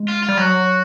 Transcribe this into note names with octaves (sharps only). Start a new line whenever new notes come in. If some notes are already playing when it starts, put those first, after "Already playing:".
Already playing: G#3
F4
F4
G3
F#3 F#4